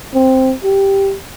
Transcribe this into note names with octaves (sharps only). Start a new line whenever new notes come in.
C4
G4